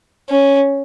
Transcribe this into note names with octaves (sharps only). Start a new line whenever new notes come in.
C#4